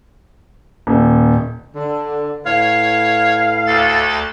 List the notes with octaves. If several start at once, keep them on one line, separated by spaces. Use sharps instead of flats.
D#1
D3
A2 B4 C#5 F5
D2 A4 A6